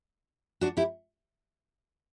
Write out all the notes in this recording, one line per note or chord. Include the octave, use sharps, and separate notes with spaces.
D4 F#4
E4 G4